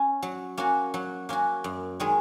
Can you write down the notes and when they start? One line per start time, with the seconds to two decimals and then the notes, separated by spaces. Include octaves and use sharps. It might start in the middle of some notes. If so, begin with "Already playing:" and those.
Already playing: C#4
0.22 F#3
0.57 A#3 C#4 F#4
0.94 F#3
1.29 A#3 C#4 F#4
1.64 F#2
2.00 D#3 G#3 C#4 G#4